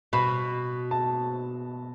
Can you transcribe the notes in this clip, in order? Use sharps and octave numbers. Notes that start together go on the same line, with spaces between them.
B2 B5
A5